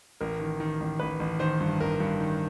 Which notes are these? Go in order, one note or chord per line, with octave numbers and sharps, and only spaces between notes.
A1 A#4
D#3
D#3
A1
A1 B4
A1
D#3 C5
G2
A1 A#4
G2
D#3